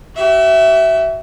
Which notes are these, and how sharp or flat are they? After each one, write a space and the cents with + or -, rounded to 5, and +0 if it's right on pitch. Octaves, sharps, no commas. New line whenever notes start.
F#4 +45 E5 +0